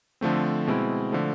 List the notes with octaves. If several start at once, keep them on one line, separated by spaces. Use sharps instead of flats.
D3 F3 A3 C4
B2 G#3 C4 E4
D3 F3 A3